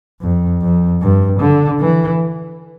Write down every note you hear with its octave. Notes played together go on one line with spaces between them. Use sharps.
F2
F2
G2
D3
E3